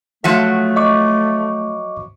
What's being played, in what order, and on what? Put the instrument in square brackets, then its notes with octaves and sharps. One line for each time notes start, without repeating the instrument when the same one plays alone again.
[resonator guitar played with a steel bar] F3 F#3 E5 [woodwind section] A3
[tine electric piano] D#5 C#6 D6